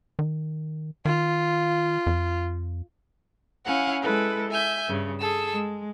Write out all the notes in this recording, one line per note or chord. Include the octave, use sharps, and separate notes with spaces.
D#3
D#3 F4
F2
C#4 E4 F5 F#5 G#5
G#3 E4 A4 B4
E5 G#5 G6
G2 C#3
G#4 A4 E6
G#3